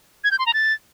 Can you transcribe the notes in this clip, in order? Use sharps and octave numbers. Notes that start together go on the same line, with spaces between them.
G#6
G6
C6
A#5
A6